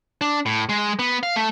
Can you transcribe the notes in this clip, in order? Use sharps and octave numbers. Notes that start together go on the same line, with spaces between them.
D4
A2
G#3
B3
F5
A3